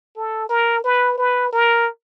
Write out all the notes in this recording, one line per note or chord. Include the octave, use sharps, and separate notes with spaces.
A4
A#4
B4
B4
A#4